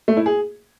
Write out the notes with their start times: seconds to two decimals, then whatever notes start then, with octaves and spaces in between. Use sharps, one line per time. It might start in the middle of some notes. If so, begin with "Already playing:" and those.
0.08 A3
0.17 E4
0.26 G#4